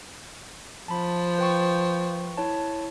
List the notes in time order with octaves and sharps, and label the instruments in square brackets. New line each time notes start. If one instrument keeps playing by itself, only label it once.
[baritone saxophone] F3 [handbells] A5 B5
[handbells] B4 G5 C#6
E4 C#5 A5